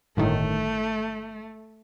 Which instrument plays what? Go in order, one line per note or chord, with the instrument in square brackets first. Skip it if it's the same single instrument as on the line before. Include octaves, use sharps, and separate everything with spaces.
[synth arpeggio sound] G1 A2 D#3 [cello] A3